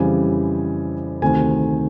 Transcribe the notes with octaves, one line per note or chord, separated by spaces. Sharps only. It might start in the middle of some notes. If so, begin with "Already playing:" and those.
Already playing: F2 C#3 E3 G3 G#5
D2 C3 D#3 G#5